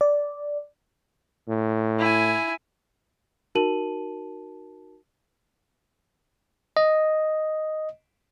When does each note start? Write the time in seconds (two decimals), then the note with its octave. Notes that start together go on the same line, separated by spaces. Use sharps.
0.01 D5
1.48 A2
1.99 E4 G#5
3.55 D#4 F#4 A#4 A5 D#7 F#7
6.77 D#5